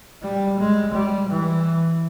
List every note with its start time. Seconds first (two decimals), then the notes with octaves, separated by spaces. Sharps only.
0.23 G3
0.59 G#3
0.94 G3
1.29 E3